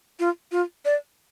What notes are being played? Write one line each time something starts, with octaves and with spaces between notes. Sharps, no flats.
F4
F4
D5